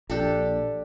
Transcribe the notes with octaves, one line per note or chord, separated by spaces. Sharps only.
A#1 D4 G4 A4